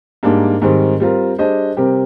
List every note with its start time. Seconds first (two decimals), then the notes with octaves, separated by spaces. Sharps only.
0.23 G#2 G3 A#3 D4
0.62 G#2 D#3 G3 C4
1.00 G3 C4 F4 A#4
1.38 G3 D4 G#4 C5 D#5
1.77 C3 G3 C4 G4 A#4